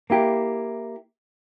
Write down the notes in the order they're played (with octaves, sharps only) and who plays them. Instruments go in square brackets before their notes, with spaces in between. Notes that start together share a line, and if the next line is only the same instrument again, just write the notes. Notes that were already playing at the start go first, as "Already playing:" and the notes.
[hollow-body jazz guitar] A#3 E4 G4